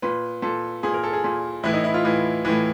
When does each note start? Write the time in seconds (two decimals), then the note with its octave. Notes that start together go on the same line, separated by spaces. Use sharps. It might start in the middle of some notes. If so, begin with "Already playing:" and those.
0.02 A#2 B4
0.42 A#2 A4
0.83 A#2 G#4
0.94 A#4
1.03 A4
1.13 G#4
1.24 A#2
1.63 A2 E3 E4
1.74 D#4
1.84 E4
1.94 F4
2.04 A2 E3
2.45 A2 E3